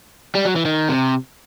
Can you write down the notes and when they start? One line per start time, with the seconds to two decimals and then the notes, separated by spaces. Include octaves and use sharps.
0.35 G3
0.45 F#3
0.56 E3
0.65 D#3
0.89 C3